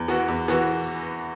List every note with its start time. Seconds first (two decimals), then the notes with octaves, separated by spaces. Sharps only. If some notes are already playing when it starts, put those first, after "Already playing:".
Already playing: E2
0.08 E3 B3 F#4
0.28 E2
0.48 E3 B3 F#4